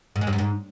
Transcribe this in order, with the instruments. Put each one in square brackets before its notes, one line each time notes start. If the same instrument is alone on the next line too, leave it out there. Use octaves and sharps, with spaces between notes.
[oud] G#2
G#3
G2
F#2
G#2